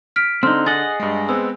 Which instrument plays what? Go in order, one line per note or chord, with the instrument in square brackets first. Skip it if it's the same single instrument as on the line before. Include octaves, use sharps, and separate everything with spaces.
[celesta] F6 B6 D7
[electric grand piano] D3 [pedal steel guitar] C4 D#4 [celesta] F6
[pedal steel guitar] G#4 D#5 F#5 [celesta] A6
[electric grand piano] G2 G#3
[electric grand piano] G#3 B3 C4 [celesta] E6